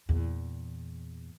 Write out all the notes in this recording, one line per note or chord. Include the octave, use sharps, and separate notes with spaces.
E2 A#2